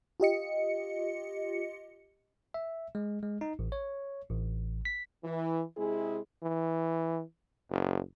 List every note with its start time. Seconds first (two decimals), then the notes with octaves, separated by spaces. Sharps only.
0.20 F4 G4 D#5 C#7
2.54 E5
2.95 G#3
3.23 G#3
3.41 D#4
3.59 A1
3.72 C#5
4.29 A1
4.85 B6
5.24 E3
5.77 C3 G#3 E4 G#4
6.43 E3
7.70 F#1